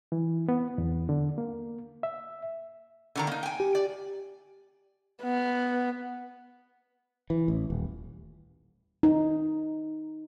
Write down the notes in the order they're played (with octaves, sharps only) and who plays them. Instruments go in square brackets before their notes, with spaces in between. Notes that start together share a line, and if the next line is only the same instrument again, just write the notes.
[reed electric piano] E3
B3
E2
D3
A#3
E5
[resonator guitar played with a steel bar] D3 D#3 A#5
A#3 D#4
G5 G#5
[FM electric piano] G4
[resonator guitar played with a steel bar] D5
[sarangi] B3
[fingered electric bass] E3
A1
D#1
[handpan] D#4